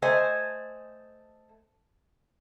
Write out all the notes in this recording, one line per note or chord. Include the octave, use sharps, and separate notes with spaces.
A3 C5 D#5 G#5